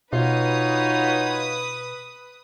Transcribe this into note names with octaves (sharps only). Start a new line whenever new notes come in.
B2 D#4 F4 F#4 B4 C#5 D#6